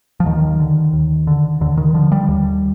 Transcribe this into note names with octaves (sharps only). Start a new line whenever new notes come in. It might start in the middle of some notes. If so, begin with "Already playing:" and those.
F3
D#2 D#3
D3
D#2
D3
D#2 D3
D#3
D3 F3
G3
D#2